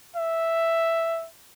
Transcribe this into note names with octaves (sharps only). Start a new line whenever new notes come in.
E5